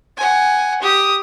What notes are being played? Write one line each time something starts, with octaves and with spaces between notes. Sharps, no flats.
F#5 G#5
G4 D#6